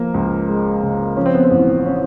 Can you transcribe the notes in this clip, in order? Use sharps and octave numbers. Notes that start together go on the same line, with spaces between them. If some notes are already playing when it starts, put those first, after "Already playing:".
Already playing: F3 A#3
C#2
G#3
C#3
F3 C#4
C4
B3
C4
A1
C#4